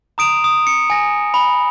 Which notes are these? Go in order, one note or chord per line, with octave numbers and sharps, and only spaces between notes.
A#5 D#6 D7 E7 F7
D#6
C#7
G#5 A#6
B5